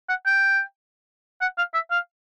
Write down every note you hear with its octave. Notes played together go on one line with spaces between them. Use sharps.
F#5
G5
F#5
F5
E5
F5